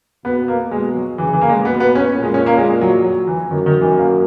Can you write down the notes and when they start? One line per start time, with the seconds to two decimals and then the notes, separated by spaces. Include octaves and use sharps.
0.25 B2 B3
0.48 A#3
0.71 B2 G#3
0.95 F#3
1.18 C#3 E3
1.33 E3
1.41 A#3
1.49 G#3
1.65 B2 B3
1.80 B3
1.95 C#4
2.11 A#2
2.23 G#3
2.34 C#4
2.46 A#3
2.57 G#3
2.81 F#3
3.04 F#3
3.27 E3
3.51 F#2 D#3
3.66 D#3
3.81 E3
3.97 A#3